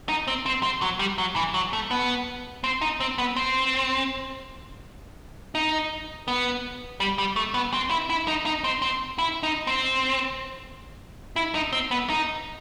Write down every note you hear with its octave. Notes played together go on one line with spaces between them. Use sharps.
D#4
C4
C4
C4
F#3
G3
F#3
E3
F#3
A3
B3
C4
D#4
C4
B3
C4
D#4
B3
G3
G3
A3
B3
C4
E4
E4
D#4
D#4
C4
C4
E4
D#4
C4
E4
D#4
C4
B3
D#4